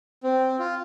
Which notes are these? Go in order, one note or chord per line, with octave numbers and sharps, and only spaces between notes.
C4
F4